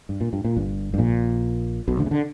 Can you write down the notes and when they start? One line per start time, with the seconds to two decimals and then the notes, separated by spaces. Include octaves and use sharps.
0.09 G2
0.21 A#2
0.33 G2
0.45 A#2
0.57 G1 G2
0.94 G2
0.98 A#1 A#2
1.88 B1 B2
1.99 D2 D3
2.06 C#3
2.11 D3